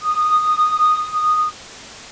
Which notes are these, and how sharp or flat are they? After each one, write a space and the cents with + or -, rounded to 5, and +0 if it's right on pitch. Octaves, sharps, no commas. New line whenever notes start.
D#6 -10